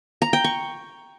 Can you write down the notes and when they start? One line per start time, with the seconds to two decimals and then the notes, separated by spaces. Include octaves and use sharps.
0.22 A#5
0.33 G5
0.44 C#6